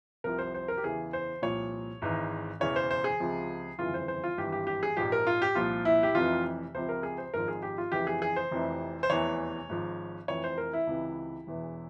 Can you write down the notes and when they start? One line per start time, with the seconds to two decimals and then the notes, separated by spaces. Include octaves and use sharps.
0.24 C2 C3 F3 A#4
0.39 C5
0.54 C5
0.68 A#4
0.77 G4
0.84 E2 C#3 E3 G#4
1.13 C5
1.42 C2 A#2 F3 C#5
2.02 G#1 G#2 E3
2.60 E1 E2 C#3 E3 C#5
2.76 C5
2.91 C5
3.04 G#4
3.20 C#2 C3 F3
3.78 G1 F2 C#3 E3 F4
3.94 C5
4.08 C5
4.24 F4
4.38 G#1 G2 E3 G4
4.52 G4
4.67 G4
4.83 G#4
4.97 A#1 G#2 F3 G4
5.12 A#4
5.27 F4
5.42 G4
5.55 C2 A#2 F3 F4
5.85 E4
6.03 G4
6.14 F1 F2 C3 E3 F4
6.74 C#2 C3 F3 C5
6.89 A#4
7.03 G#4
7.18 C5
7.34 G#1 G#2 F3 A#4
7.48 G#4
7.62 G4
7.78 F4
7.92 F1 F2 C#3 E3 G4
8.07 G#4
8.22 G#4
8.36 C5
8.51 F1 F2 C3 E3
9.03 C5
9.10 F1 E2 E3 C#5
9.69 G#1 G#2 F3
10.28 F1 F2 E3 C#5
10.44 C5
10.58 A#4
10.73 E4
10.87 C#2 C3 E3
11.47 E1 E2 E3